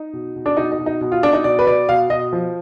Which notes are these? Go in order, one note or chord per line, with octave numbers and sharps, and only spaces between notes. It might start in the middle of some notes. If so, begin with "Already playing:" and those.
Already playing: D#4
B2
B2
D4
B2 D#4
D#4
B2
D#4
B2
F4
B2 D4
D#4
B2 D5
B4
B2 D5
B2 F5
B2 D#5
F3